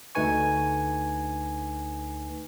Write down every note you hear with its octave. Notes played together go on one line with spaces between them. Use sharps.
D2 A3 D#4 B4 G#5 C#6